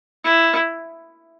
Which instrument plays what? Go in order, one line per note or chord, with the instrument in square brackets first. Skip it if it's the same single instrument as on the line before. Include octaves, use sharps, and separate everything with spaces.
[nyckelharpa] E4